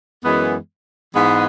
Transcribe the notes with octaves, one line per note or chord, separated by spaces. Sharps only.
F#2 E3 G#3 B3
G#2 E3 G#3 B3